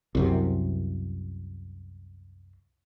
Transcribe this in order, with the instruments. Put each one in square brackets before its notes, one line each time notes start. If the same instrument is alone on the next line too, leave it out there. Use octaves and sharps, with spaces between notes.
[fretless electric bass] C2 F#2 C3